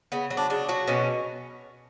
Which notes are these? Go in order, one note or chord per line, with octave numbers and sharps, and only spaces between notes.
C#3 B3
F#3
D4
C#3 D4
F#3 F#4
B2 C#4